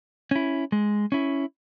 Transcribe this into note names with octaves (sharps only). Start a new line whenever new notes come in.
C#4 E4
G#3
C#4 E4